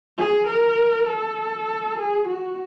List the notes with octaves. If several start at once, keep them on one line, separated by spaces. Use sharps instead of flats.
G#4
A#4
A4
G#4
F#4